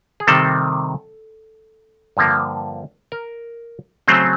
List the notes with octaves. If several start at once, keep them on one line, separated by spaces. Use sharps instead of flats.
G#4
C3 D#3 G3 C4 A4
G2 D3 F3 A#3
A#4
C#3 F#3 A3 C4 C5